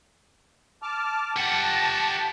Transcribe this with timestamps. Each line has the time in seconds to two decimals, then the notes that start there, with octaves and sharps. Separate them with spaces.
0.82 A5 D6 F6
1.36 G4 F#5 A5